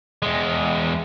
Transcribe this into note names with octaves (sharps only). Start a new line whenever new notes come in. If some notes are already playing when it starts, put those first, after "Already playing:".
E2 G#3